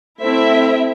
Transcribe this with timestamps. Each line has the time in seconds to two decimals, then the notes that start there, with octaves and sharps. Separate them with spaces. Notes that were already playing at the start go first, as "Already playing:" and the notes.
0.21 A3 C4 E4 E5